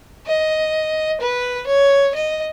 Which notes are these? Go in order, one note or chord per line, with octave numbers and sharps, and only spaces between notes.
D#5
B4
C#5
D#5